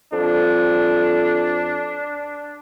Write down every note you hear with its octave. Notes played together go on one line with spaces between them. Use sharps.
F2 D4